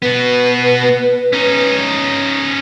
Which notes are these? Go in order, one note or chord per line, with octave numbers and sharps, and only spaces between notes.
B2 B3 B4
C#4 D#4